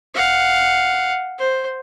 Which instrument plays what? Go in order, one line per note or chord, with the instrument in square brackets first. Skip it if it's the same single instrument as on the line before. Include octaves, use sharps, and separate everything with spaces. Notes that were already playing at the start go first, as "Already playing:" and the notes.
[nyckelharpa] F5 F#5
C5